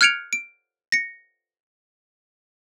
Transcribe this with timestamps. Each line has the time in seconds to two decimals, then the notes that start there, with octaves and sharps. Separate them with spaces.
0.01 F6 F#6 G#6 C#7 D7 F7
0.33 D7
0.92 A#6 C#7